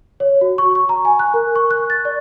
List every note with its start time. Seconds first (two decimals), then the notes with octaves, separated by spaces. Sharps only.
0.20 C#5
0.41 F#4
0.58 C#6
0.75 C#6
0.89 A#5
1.05 G#5
1.19 F#6
1.34 A#4
1.56 C#6
1.71 F#6
1.90 A6
2.05 D5